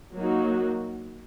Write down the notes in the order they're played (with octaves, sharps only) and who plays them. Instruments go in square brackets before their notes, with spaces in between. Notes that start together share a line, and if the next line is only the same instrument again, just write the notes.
[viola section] F#3 A#3 D#4 F#4